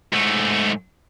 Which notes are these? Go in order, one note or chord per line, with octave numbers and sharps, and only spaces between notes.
G#2 A3